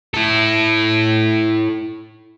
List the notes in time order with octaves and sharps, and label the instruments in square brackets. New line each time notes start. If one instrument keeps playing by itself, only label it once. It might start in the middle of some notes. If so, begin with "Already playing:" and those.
[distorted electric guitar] E4 A4